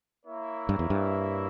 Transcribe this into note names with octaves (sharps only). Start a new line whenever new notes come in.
A#3 E4 A#4 C#5 E5
G2
E2
G2